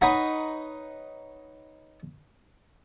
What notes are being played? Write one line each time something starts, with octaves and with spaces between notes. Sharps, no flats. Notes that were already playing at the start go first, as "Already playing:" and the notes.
D#4 B4 C#5 F#5 A#5